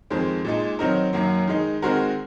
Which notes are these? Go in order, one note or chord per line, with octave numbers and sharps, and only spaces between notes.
F2 D#3 G#3 C4
A#2 G#3 D#4
D#3 F#3 C4 D#4 A#4
F#2 D#3 F#3 A#3
D#3 G#3 D#4
D#3 G#3 C4 F#4 A#4